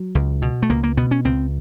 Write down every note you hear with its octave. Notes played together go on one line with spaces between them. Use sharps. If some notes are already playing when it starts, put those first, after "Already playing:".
Already playing: F#3
C#2
B2
A3
C#2 A#3
A#3
B2 B3
C#4
C#2 C4